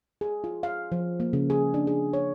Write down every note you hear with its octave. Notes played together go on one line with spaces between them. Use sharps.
G#4
F4
F5
F3
A#3
C#3
G#4
D4
G#4
C#5